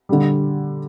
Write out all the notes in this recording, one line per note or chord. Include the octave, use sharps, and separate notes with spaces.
D3 G3